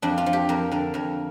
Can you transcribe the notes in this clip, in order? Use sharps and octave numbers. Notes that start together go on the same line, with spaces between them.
F2 D4
F4
F3
G4
F2 A#4
D3 A#4
F2 A#4